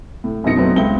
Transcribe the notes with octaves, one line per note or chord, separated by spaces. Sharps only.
A2
F#2 B2 C4 D#4 A#6 C#7
F#3 A3 B3 C4
C#2 B3 C4 E5 G5 G7